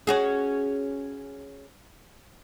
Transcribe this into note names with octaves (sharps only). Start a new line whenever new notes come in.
C#4 F#4 G#4